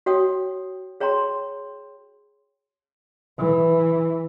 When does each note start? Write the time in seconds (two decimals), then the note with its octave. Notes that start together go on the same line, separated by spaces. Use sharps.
0.06 F#4 C#5 G5 D#6
1.00 G#4 C#5 G5 A#5 C6
3.39 E3